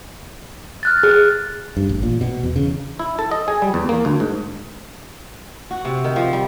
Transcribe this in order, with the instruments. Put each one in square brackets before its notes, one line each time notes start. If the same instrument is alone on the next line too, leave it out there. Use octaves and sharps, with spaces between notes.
[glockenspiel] F6 F#6 A6
[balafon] G#4
[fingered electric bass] G2
A1
A#2
B2
E2
C#3
[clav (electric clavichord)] E4
A4
D#5
G#4
G3
E2
A#3
D2
G#2
[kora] F#4
C3
D#3
F3
G3